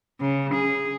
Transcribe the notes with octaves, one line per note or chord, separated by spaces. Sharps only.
C#3
G#4